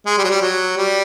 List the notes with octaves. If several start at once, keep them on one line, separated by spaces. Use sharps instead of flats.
G#3
G3
F#3
G3
F#3
G3